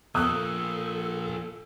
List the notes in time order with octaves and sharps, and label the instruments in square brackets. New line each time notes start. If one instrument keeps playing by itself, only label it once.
[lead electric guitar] F3 A#3 [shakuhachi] A4 [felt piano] D#6 E6 F#6